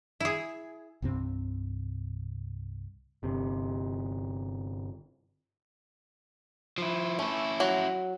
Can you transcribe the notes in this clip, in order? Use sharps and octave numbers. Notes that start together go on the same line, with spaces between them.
E4 G#4
C2 G2 C3 C4
G1 C3
F3 E4
A3 C#4 E4
F#3